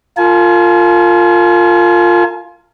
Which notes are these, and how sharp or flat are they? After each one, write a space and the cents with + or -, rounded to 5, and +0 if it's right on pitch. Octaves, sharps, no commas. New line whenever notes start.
F4 +0 A#4 -35 G#5 +40